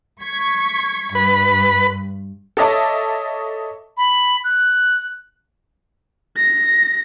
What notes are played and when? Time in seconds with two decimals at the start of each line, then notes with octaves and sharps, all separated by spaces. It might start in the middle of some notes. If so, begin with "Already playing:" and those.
0.23 C#6 G#6 B6
1.15 G2 B4 B5
2.57 A4 C#5 D#5 E5 A5 D6
3.97 B5
4.44 F#6
6.37 A#6